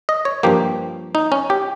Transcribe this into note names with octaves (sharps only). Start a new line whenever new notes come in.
D#5
C#5
G2 F3 A#3 G4
D#4
C#4
G4